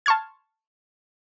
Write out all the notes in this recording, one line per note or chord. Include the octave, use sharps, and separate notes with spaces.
A5 C6 C#6 F6 G#6